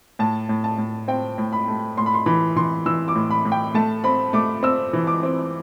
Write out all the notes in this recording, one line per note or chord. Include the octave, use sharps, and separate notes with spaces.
A2 A5
A2
A5
A2
C4 G5
A2
B5
A3
A2 C6
B5
C6
E3 B5
E3 C6
E3 E6
D6
A2
B5
A2
G5
A3 A5
C4 B5
A3 D6
C4 E6
E3
D6
C4